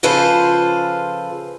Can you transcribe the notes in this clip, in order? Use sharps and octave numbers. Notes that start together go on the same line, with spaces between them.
C#3 F3 F4 A4 B4 C5